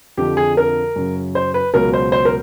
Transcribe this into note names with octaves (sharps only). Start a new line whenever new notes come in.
F2 D3 F3 G4
G#4
A#4
F#2 C#3 F#3
C5
B4
C#2 B2 F#3 A#4
C5
C5
A#4